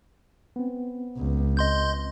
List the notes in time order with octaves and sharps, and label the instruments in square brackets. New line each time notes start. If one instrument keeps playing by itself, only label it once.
[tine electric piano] B3 C4
[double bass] C#2
[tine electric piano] C4 [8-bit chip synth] D#5 C6 G6